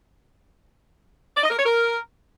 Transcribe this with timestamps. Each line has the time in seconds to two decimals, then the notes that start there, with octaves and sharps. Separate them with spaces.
1.36 D5
1.43 D#5
1.50 A#4
1.58 C#5
1.65 A#4